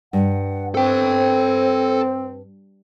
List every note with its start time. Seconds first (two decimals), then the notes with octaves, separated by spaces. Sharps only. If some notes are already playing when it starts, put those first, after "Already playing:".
0.13 G2 F#5
0.75 C4 A4 C5 G5